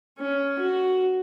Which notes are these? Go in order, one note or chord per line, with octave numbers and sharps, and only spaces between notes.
C#4
F#4